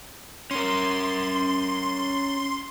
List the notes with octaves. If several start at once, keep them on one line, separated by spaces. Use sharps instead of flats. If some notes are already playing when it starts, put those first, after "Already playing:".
C#4 A#4 C6